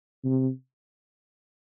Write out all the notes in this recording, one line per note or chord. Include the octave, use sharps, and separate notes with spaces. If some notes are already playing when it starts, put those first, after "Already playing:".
C3